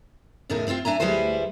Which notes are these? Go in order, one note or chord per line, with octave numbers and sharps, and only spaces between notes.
E2 A2 C#3 A3 D#4 A#4
G3 C4 E4 F4 G5
D4 E5 G#5 A#5
D2 G3 G#3 E4 B4 C5